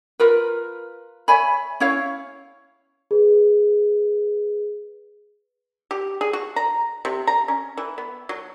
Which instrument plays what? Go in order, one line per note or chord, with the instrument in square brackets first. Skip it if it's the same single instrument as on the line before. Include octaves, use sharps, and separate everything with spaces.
[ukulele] F4 A#4 B4
C#5 E5 G#5 B5
C#4 E4 C#5 F5
[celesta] G#4 B4
[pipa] G4
G#4
F#4
A#5
C3
A#5
C#4
E3
B3
F#3